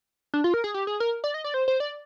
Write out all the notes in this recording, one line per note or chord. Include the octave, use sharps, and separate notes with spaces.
D4
F4
A#4
G#4
G4
G#4
A#4
D5
D#5
D5
C5
C5
D5